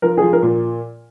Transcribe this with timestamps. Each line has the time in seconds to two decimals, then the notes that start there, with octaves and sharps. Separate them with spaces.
0.02 F3 A#4
0.17 F3 G#4
0.33 A#4
0.42 A#2